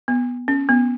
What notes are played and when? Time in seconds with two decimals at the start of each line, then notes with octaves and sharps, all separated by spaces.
0.08 B3
0.48 C#4
0.69 B3